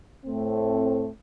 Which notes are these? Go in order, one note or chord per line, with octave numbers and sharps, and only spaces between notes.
A2 A3 C4